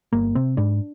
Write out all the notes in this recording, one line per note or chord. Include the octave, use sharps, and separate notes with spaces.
G1 A#3
C3 C4
G#2 D4